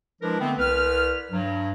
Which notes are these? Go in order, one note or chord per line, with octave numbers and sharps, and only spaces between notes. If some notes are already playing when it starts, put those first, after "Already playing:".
F3 G#3 D4 E4 A#4 B4
D3 A3 B3 C4
C2 B4 F6
G2 F#3